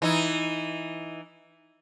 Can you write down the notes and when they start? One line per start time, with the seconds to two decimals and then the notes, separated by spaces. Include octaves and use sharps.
0.02 E3 D#4